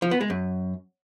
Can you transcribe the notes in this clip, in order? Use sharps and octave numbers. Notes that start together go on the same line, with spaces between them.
F3
B3
G#3
F#2